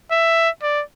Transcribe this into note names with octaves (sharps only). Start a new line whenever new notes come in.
E5
D5